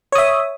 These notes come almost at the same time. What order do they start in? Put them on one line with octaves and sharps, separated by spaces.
C#5 D#6 E5